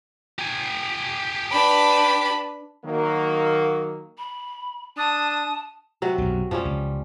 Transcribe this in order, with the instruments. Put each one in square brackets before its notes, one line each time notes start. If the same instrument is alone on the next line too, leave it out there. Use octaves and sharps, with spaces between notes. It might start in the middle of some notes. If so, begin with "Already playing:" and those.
[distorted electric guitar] G4 G#5
[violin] D4 B4 [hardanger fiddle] B5
[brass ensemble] D#3 F#3 A#3
[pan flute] B5
[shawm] D4 [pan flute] A5 [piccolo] D#6
[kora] C3 F#3 F#4
[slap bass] B1 F#2
[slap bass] F2 [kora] F3 G3 C#4
[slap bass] C#2